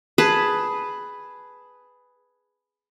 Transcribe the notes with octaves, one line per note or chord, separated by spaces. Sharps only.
G#4 B4 A5